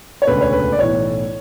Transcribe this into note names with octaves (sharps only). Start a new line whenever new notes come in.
C#5
E1 D2 C#3 B4
C#5
B4
D5
B1 A2 E3 C#5